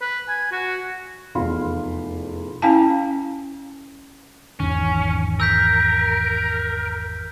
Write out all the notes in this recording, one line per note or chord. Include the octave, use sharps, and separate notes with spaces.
B4
G#5
F#4
F1 E2 F4 F5 B5 C6
C#4 E4 F5 G#5 A5
G#1 E2 D#3 C#4
A#4 E6 G6 B6